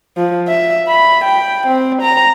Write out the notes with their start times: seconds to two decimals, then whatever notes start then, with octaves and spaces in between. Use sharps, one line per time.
0.17 F3
0.48 E5
0.88 B5
1.24 G5
1.67 C4
2.02 A#5